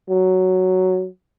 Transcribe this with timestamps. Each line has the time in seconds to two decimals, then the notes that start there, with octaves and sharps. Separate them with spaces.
0.09 F#3